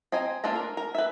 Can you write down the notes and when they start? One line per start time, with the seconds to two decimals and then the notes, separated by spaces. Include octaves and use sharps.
0.12 C4 D#5 G#5 A#5
0.44 A#3 D4 F4 A4 A#5
0.56 A#4
0.77 A#4
0.95 B4 E5